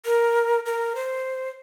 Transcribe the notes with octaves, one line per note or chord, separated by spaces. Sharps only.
A#4
A#4
C5